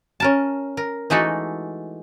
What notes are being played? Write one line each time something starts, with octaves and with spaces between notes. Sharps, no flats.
C#4 A#4 A5
A#4
E3 G#3 A3 D#4 F#4 A4